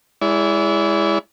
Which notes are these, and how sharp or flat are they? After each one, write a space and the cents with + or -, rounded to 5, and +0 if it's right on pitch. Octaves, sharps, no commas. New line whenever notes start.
G#3 -15 E4 +0 D5 -40